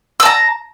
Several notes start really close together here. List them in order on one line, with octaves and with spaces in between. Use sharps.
E6 A5 A#5